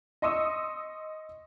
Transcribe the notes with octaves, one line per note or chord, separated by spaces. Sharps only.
D#5 C6 C#6 D#6 E6